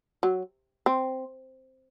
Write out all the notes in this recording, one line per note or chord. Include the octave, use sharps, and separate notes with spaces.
F#3
C4